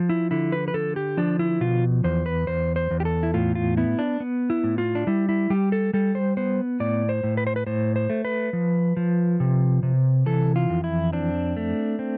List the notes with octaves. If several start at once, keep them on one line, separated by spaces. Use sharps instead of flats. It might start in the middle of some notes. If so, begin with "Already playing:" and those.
Already playing: F3
E4
D3 E4
B4
B4
D3 A4
G4
F3 D4
E4
B2 F4
E2 C5
B4
E2 C5
C5
E2
G4
A4
E4
A2 F4
F4
B3 E4
D4
B3
E4
A2
F4
D4
G3 E4
E4
G3 G4
A4
G3 A4
C5
B3 C5
A2 D5
C5
A2
B4
C5
B4
A2 C5
C5
A3
B4
F3
F3
C3
C3
E3 A4
F4
F2
E4
C4 D4
A3
C4